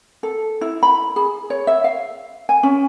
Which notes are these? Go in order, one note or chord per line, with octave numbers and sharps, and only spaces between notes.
A4
E4
B5
G#4
C#5
E5
F5
G#5
C#4